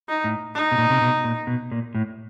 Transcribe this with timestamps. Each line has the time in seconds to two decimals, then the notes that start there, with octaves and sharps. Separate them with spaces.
0.09 D#4
0.24 A2
0.55 D#4
0.72 B2
0.78 A#2
0.90 C3
1.01 B2
1.24 A#2
1.47 B2
1.71 A#2
1.95 A2